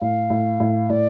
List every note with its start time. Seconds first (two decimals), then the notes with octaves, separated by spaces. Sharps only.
0.01 A2 F5
0.30 A2
0.60 A2
0.90 A2 D5